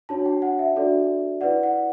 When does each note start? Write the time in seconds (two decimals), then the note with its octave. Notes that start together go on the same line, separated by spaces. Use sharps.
0.09 D4 F#4 C#5 A5
0.26 G5
0.42 F#5
0.59 E5
0.75 D4 F#4 A4 D5
1.41 E4 B4 D5 F#5
1.63 F#5